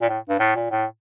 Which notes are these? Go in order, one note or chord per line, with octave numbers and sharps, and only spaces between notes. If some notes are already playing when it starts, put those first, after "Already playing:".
A#2
A2
G2
A2
A#2
A2